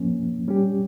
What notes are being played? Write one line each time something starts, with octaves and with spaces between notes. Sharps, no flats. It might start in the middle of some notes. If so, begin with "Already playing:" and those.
Already playing: F3 A#3 C#4
G3 C#4 G4